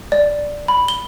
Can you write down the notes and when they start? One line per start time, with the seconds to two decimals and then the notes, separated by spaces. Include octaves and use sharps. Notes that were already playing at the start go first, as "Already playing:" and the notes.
0.12 D5
0.68 B5
0.88 G7